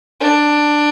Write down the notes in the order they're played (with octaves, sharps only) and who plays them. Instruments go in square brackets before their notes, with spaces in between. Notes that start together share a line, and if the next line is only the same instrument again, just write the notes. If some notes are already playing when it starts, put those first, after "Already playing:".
[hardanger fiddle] D4